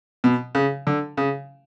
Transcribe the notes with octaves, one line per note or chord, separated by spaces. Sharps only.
B2
C#3
D3
C#3